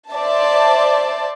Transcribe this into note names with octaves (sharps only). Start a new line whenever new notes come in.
C5 D5 E5 A5